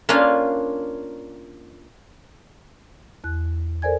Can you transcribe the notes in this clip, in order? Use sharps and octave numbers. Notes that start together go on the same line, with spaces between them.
A#3 C#4 D4 F4 F5
E2 F#6
A4 A#4 C5 D5 G#5 G#6